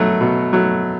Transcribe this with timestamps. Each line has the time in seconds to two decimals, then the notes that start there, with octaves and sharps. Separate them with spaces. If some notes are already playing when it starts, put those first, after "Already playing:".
Already playing: B2 F#3 A3
0.21 B2
0.53 F#3 A3